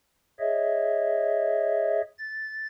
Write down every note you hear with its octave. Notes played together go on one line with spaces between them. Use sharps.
G#4 C#5 D#5 E5
A6